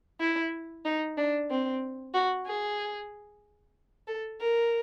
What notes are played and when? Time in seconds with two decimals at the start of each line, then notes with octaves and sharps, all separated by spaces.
0.20 E4
0.85 D#4
1.17 D4
1.50 C4
2.14 F#4
2.46 G#4
4.07 A4
4.40 A#4